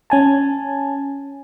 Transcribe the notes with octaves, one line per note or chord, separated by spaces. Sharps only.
C#4 G#5 A5